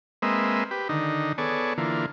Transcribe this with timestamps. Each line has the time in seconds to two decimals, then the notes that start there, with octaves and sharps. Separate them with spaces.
0.22 G#3 A#3 C4 B4 D#5 E5
0.71 G4 B4
0.89 D3 D#3 D#4
1.38 B3 G#4 A4 C#5 D5
1.78 D3 E3 A#3 F4